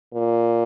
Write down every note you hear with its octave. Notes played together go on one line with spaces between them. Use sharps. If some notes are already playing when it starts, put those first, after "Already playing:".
A#2